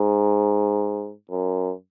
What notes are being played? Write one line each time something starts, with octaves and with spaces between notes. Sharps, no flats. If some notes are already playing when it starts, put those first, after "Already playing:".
Already playing: G#2
F#2